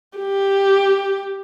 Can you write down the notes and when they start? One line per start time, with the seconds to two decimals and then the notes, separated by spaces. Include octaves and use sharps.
0.18 G4